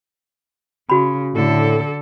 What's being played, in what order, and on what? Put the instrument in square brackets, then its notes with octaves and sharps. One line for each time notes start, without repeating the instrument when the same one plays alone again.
[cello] C#3 [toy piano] F#4 B5
[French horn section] A2 [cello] D3 A4